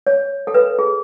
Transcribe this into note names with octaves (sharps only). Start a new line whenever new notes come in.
C#5
A4
B4
G#4